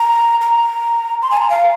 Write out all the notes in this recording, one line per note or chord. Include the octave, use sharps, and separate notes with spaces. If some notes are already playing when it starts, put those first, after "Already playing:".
Already playing: A#5
A#5
C6
G#5
A#5
F5